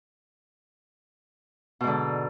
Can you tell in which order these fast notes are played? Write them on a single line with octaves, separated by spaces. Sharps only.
B2 G#2 D3